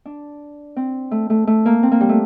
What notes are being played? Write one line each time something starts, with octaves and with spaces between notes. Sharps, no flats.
D4
C4
A3
A3
A3
A#3
C4
A#3
G3
A3